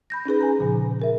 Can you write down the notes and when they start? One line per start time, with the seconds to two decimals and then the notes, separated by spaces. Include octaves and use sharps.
0.10 B5 G6 A#6
0.26 C#4 D#4 G#4 B4
0.41 G#5 A#5
0.59 A#2 C#3 F3
1.00 G#4 A#4 E5